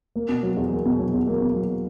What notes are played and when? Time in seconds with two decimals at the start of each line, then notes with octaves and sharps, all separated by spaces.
0.16 A#3
0.29 B2
0.43 F#3
0.57 E2
0.72 A#3
0.86 B2
0.99 F#3
1.13 E2
1.28 A#3
1.41 B2
1.55 F#3